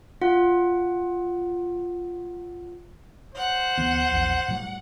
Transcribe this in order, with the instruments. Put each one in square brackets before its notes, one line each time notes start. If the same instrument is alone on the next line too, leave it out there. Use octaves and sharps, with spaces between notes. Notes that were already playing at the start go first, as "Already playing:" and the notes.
[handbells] F4 F#5
[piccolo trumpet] C5 [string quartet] F#5
[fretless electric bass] D1 E3 B3
A#1 E2
A2 F#3 G3